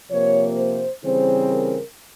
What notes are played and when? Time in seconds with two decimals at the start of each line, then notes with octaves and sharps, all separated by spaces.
0.10 C3 F3 A#3 C#5
0.57 C5
1.04 C#3 E3 G3 C4 C5
1.50 A#4